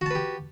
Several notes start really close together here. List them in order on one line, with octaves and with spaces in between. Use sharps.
F#4 A5 B4 G4